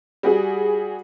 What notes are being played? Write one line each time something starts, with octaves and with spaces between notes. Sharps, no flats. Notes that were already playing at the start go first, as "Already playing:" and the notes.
G3 F#4 G#4